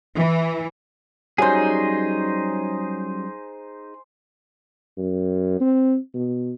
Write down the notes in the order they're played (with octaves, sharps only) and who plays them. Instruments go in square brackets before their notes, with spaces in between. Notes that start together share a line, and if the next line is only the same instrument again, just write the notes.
[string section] E3
[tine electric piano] F#3 G3 C#4 [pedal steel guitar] D#4 G#4 [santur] C5 G#5
[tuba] F#2
C4
B2